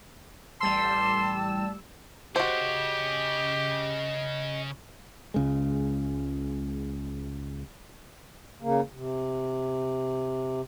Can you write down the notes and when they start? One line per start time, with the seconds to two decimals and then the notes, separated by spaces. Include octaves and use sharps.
0.61 A1 G3 A5 C6 E6
2.36 C#3 F#4 G4 C5 D#5
5.34 C#2 C#3 G#3
8.61 C#3 A#3
8.93 C3